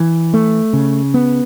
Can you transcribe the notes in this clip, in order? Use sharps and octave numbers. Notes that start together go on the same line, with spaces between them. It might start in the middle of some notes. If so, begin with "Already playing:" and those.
Already playing: E3
A3
C#3
B3